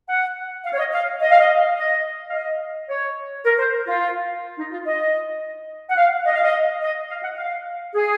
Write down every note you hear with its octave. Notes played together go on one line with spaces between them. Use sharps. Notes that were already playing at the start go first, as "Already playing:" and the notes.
F#5
F5
C#5
D#5
F5
D#5
F5
D#5
D#5
F5
D#5
C#5
A#4
C5
F4
D#4
F4
D#5
F#5
F5
D#5
F5
D#5
D#5
F5
F#5
F5
G#4